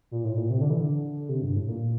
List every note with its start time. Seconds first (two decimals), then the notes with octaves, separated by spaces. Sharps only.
0.11 A#2
0.24 A2
0.37 A#2
0.50 C3
0.61 D3
0.70 E3
0.80 D3
1.29 C3
1.42 G2
1.56 A2
1.68 A#2